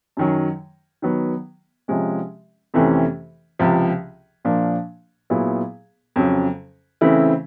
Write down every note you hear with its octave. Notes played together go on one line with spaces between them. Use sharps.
F#2 D#3 F#3
D#3 F#3 B3
C3 F3 G#3 C#4
F2 C3 E3 A3 C#4
C#2 C3 F3
A#2 F3 A#3 D4
A#2 F#3 B3 E4 G#4
F2 C#3 F#3
C#3 E3 A3 C4 E4